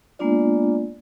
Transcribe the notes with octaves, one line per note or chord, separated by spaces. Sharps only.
G#3 A#3 B3 D4 F4 D5